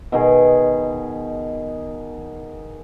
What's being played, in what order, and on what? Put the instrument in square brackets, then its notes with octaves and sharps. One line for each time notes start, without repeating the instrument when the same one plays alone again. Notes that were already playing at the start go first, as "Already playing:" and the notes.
[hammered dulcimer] B2 D#3 G#4